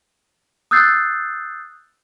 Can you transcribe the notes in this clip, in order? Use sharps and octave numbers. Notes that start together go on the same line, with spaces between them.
D#6 E6 F#6 G6 A6 C7